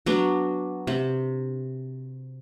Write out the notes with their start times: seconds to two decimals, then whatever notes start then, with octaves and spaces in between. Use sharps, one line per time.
0.06 F#3 B3 D4
0.87 C3